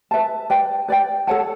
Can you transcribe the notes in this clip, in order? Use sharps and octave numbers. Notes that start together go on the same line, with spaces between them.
B4 E5 A5
B4 D5 G5
B4 D5 G5
A4 C#5 F#5 A5